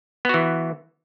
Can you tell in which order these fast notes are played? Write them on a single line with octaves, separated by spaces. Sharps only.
B3 F#4 E3